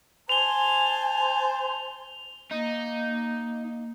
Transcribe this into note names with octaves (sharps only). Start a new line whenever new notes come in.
C5 G#5 A5 F7 G7
A#3 D#4